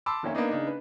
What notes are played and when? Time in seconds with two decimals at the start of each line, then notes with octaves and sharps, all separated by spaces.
0.06 A5 B5 C6 D6 E6
0.23 F1 D#3 A#3 C#4 E5
0.35 A#3 B3 D4 D#4
0.49 C#3 D4 D#4
0.67 B4